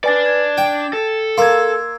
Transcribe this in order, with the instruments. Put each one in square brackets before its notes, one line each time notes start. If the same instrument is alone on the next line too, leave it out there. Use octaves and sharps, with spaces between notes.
[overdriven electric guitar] D4 D5 [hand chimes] B4 G#5 A6
[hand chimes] G#6
[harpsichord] G5
[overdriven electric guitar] A4
[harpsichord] A#3 [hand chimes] C6 E6 G#6